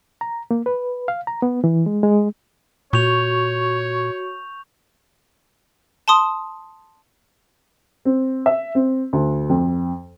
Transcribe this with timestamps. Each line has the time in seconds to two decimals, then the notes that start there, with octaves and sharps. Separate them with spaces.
0.21 A#5
0.51 A#3
0.66 B4
1.08 F5
1.27 A#5
1.42 B3
1.64 E3
1.86 G#3
2.03 G#3
2.93 A#2 F#4 C#5 C#6 G6 F7
6.08 A5 C6 D#6
8.05 C4
8.46 E5
8.75 C4
9.13 D2
9.49 F2